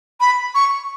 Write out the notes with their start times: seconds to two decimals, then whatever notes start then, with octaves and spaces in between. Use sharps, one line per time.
0.20 B5
0.54 C#6